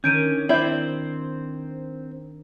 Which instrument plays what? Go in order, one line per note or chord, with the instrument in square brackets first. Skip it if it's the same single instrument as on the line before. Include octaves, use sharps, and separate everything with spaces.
[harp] D#3 D4 [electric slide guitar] C#4 [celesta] G6 D7 D#7
[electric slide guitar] C4 C5 [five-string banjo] E4 D5 E5 [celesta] G6 G#6 F#7